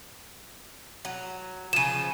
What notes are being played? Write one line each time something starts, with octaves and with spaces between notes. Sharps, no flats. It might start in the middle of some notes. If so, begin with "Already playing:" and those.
F#3
C#3 F3 D#7 E7